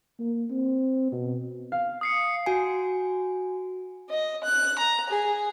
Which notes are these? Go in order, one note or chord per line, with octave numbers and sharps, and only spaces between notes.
A#3
C4
B2
F5
D#6 C7 C#7
F#4 G#5
D#5
F#6
A#5
G#4